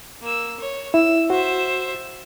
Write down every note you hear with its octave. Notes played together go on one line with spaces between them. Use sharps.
A#3 E6
C#5
E4 E6
F#4 C5 E5